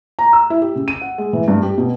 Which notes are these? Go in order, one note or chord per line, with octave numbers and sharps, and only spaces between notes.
A#5
E6
E4
G4
C#3
D#7
F#5
G#3
E3
G2
G4
B2